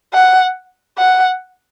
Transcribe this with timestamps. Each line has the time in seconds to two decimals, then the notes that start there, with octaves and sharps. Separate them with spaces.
0.14 F#5
0.98 F#5